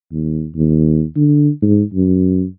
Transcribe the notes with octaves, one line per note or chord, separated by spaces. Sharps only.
D#2
D#2
D3
G#2
F#2